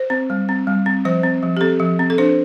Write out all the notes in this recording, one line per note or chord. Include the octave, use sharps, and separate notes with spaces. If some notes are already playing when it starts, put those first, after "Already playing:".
Already playing: C5
C4
G3
C4
G3
C4
F3 C5
C4
F3
G4
C4 A4
F3
C4
A4
D4 C5